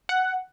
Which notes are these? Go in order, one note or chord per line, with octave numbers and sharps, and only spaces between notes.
F#5